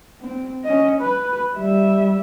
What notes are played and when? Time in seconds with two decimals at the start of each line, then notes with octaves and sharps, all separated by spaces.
0.21 C4
0.65 C#4 D#5
1.01 B4
1.55 G3 E5